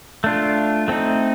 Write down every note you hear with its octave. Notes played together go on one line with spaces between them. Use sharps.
A3 D4 F4
A3 C4 D#4